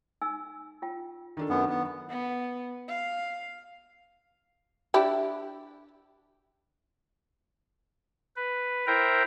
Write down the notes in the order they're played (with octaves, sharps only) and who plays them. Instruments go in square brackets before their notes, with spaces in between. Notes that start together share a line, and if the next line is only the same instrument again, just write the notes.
[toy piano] D#4 G#5 E6
F4 G5
[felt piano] D#3 D4 A4
[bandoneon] F#2 B3
B3
[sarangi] B3
F5
[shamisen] D4 E4 G4
[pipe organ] B4
E4 A#4 C5 G5 A#5